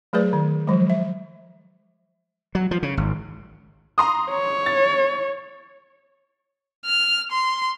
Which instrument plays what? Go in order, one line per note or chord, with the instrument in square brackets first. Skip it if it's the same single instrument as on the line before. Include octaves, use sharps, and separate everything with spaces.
[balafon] F#3 A3 G#4 B4 D5
D#3
F3 F#3 G#3
E5
[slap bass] F#3
F3
C#3
G#1
[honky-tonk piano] A#5 C6 D#6
[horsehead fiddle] C#5
[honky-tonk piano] A6
[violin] F6
C6